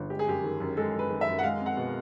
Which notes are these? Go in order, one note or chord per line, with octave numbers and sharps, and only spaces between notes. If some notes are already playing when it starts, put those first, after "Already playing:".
Already playing: G1
G#3 G4
G#4
F#2 G4
D#3
F#2
G#3 A4
F#2
B4
D#3
E5
F#2
F#5
G#3 F5
C4
F#5
B2